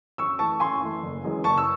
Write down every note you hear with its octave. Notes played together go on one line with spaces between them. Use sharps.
F#2 C#6 E6
E3 A3 A5 C#6
F#2 G#5 C6
E3 A3
F#1
F#2 E3 G#3
F#1 A5 C#6
E6